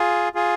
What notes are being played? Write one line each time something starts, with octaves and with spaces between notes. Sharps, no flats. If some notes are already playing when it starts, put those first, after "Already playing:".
Already playing: F4 G#4
F4 G#4